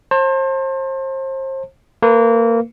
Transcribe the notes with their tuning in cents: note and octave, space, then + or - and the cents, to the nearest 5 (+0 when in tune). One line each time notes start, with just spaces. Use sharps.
C5 +35 A5 +35
A#3 -25 B4 +0